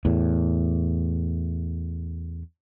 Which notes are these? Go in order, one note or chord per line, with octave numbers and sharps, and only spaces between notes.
E2 A2